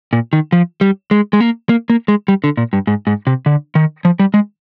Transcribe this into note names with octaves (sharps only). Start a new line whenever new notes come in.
A#2
D#3
F3
G3
G#3
G#3
A#3
A#3
A#3
G#3
G3
D3
A#2
G2
G#2
G#2
C3
D3
D#3
F3
G3
G#3